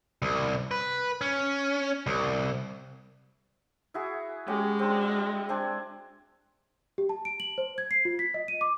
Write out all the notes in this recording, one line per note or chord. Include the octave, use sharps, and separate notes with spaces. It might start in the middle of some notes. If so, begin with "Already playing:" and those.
C2
B4
C#4
C2
E4 F#4 G#4
G#3 C#4 F#4 G4
C4 D4
C4 D4 G#5
G4
A5
D7
F#7
C5
G#6
C7
F4
B6
D#5
D#7
D6